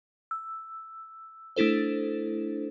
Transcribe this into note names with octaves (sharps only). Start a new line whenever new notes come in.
E6
A3 D4 E4 A4 C5